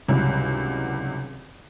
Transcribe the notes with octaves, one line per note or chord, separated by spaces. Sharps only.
G#1 C#2 C3 E3 F#3 G3